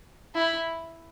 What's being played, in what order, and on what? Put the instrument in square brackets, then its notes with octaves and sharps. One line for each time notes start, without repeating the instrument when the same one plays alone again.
[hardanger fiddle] E4